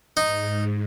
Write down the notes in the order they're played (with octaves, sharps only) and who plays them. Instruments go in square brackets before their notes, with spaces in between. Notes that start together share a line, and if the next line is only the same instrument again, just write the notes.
[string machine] G#2 [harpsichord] D#4